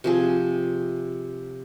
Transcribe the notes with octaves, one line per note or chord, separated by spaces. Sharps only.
C3 F3 G#4